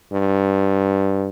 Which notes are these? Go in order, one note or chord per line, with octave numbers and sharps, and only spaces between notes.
G2